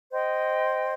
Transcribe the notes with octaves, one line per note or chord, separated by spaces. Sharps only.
C5 D#5 G5